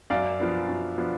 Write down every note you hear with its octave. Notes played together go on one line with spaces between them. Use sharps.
F#2 D5 F5
F3 B3 D4
F#2
F3 B3 D4